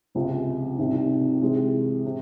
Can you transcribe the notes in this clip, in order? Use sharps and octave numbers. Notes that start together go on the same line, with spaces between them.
C#2 C3 F3
C2 C3 D#3
C3 E3 G#3
C3